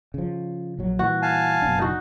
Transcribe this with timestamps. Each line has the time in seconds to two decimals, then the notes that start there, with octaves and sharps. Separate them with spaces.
0.14 C#3 F3
0.79 A#1 F#3
0.99 A#2 E3 G3 F#4
1.22 F5 G#5 A5
1.62 F#1 B2 D4
1.79 D#4 F#4